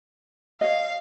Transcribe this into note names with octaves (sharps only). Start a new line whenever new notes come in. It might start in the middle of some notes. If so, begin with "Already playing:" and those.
C#5 D#5 F5